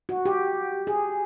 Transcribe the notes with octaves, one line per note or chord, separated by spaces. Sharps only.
F#4
G4
G#4